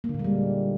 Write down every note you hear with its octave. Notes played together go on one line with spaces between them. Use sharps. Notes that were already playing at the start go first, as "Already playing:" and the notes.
A#3
D3
A#2
G#3
G3